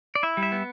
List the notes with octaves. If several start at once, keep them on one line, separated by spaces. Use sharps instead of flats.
D5
E4 E5
G3
E5
B3